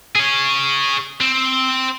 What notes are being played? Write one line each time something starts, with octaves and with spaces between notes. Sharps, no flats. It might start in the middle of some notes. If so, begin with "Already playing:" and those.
G#4 C#5
C4